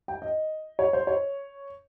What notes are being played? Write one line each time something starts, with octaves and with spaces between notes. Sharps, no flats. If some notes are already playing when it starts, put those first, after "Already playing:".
G5
D#5
C#5
C5
C#5